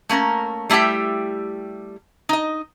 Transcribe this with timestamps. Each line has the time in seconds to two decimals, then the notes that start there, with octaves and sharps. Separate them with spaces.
0.09 A3 A#3 C#4 A#4
0.69 G3 A3 E4 G4 G5
2.29 D#4 D#5